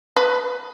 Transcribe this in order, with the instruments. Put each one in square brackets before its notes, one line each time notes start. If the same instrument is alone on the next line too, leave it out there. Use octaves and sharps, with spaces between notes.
[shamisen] B4